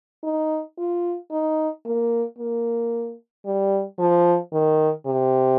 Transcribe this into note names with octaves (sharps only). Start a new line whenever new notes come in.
D#4
F4
D#4
A#3
A#3
G3
F3
D#3
C3